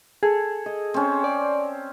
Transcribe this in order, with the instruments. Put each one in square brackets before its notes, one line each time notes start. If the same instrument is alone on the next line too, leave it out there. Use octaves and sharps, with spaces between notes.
[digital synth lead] G#4 [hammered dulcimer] A4
[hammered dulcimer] D#5
C4 C#4
[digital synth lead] D5